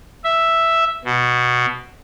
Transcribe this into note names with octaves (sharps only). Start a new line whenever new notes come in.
E5
B2